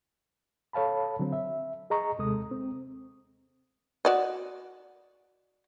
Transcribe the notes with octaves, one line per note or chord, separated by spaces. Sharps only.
A4 C#5 F5 A5 B5
D3 F#3 C4
E5
G#4 D#5 A#5 C#6
D#2 C3 G#3 A4 D#6
C4
F#4 D5 D#5